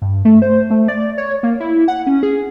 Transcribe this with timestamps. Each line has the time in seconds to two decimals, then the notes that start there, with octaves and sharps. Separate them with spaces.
0.02 G2
0.25 A3
0.42 C5
0.70 A3
0.88 D5
1.18 C#5
1.43 A#3
1.60 E4
1.88 F#5
2.07 C#4
2.23 G#4